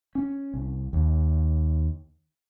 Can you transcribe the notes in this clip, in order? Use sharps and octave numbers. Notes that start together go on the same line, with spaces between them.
C#4
C2
D#2